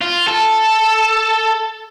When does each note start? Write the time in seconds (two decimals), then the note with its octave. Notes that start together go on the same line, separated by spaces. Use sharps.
0.02 F4
0.28 A4